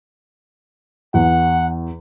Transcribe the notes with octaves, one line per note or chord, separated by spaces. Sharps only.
E2 F#5